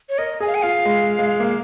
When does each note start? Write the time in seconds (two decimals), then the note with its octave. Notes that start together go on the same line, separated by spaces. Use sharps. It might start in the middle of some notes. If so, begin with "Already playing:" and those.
0.09 C#5
0.18 A#4 D#5
0.40 G#4 G#5
0.47 F5
0.55 G#5
0.63 F4 F5
0.85 G#3
1.19 G#3
1.40 A#3